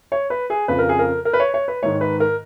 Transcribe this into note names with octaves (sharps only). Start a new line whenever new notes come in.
C#5
B4
G#4
F2 C#3 F3 B4
A#4
G#4
A#4
A#4
B4
C#5
C#5
B4
G#2 D#3 C#5
B4
A#4